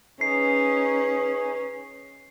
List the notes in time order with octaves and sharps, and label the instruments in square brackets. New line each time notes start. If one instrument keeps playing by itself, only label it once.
[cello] C#4 [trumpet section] D#4 G#4 [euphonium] B4 [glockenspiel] C7